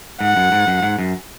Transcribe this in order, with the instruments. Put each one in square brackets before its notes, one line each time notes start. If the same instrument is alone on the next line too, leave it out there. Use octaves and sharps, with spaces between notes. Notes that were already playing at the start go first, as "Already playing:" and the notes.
[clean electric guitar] G#2 [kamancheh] F#5
[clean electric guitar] F#2
G#2
F#2
G#2
F#2